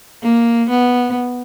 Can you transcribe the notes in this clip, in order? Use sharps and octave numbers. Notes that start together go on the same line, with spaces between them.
A#3
B3